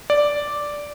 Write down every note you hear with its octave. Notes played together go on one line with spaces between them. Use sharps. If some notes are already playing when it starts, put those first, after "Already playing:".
D5